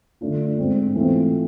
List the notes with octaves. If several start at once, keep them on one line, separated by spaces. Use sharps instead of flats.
D3 A3 D4 F4
G#2 G#3 C4
E3 A3 C4 F4